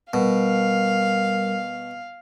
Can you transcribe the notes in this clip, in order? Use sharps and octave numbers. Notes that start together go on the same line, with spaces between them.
B2 G3 A#4 F5